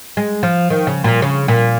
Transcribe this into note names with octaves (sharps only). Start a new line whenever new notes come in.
G#3
F3
D#3
C#3
A#2
C#3
A#2